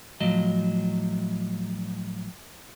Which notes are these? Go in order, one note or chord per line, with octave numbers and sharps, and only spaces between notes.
A2 F3 F#3 D#5